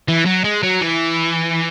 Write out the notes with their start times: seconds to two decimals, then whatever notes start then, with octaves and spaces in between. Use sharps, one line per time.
0.08 E3
0.26 F#3
0.44 G#3
0.63 F#3
0.81 E3